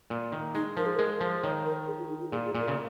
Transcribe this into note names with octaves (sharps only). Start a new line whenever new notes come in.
A#2
D#3
G#3 D#4
F3 A#4
G#4
G#3 A#4
F3
D#3 C#5
A#4
G#4
F4
D#4
F4
A#2 G#4
G#4
A#2
A#4
C#3